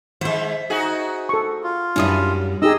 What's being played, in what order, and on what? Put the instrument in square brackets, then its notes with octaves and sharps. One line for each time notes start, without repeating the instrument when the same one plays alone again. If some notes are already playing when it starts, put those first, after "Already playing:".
[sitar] D#3 G#3 [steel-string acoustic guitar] C5 E5
[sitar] D#4 F#4 G#4
[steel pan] A4 C#6
[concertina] F4
[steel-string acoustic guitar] F#2 G3 G#5 [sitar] F#3 [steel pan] D4 E4 D#6
[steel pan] D#4 G4 G#4 [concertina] D#5 E6